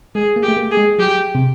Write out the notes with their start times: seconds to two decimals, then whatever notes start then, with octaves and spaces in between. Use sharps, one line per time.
0.15 G#3 G#4
0.36 A#3
0.43 G4
0.48 A3
0.57 A#3
0.71 G#4
0.77 G#3
0.99 F#3 G4
1.35 C3